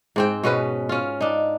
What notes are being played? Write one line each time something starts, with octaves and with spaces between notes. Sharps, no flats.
G#2 C4 G5
B2 C#4 F#4 B4
C#4 F4
D4 D#4